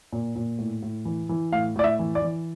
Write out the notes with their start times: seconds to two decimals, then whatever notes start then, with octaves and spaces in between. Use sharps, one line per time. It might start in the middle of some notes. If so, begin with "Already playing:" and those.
0.12 A#2
0.36 A#2
0.59 A2
0.83 A2
1.05 E3
1.29 E3
1.52 A2 F5
1.76 A2 D5
1.84 E5
1.99 E3
2.15 D5
2.22 E3